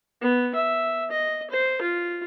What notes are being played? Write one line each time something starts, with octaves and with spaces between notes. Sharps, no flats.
B3
E5
D#5
C5
F4